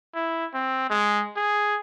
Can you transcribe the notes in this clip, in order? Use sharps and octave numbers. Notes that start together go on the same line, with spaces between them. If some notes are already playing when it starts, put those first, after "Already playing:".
E4
C4
G#3
G#4